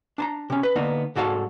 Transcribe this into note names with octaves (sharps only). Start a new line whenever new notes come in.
D4 A5 A#5
C3 C#4
B4
D3 A#3 B3 D#4
C2 G#2 F#4 A4 F5 A5